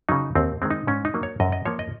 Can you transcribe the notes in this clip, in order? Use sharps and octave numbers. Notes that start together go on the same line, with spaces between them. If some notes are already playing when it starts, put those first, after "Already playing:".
C#3 F#3 D#4
D#2 C4
D#3 G#3 C4
D#4
G#2 C#4
D#4
F#3 A#3
C#5
F#2 D#5
D#5
F3 A#3 C#5
D#5